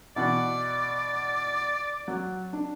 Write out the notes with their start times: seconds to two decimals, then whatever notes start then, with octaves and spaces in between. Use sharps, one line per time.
0.16 B2 E3 D5 F#5
2.08 F#3
2.53 D4